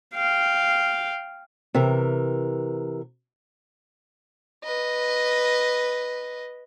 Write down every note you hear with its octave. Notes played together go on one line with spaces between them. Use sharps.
F5 G5
C3 E3 A#4
B4 D#5